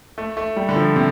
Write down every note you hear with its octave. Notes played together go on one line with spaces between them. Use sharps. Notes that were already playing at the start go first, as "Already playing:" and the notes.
A3
A3
G3
D3
F3
C3